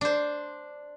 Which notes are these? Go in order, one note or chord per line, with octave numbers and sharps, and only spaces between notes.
D4 C5